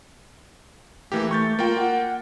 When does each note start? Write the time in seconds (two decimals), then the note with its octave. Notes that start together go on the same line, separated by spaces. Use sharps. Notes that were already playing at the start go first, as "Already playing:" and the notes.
1.12 E3 A3 A#3 G4
1.31 A3 C#6 G6 A6
1.59 A#3 F4 G5
1.79 F#5